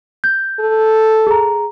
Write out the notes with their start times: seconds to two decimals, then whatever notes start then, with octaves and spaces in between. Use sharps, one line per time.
0.24 G6
0.60 A4
1.27 G#4 A#5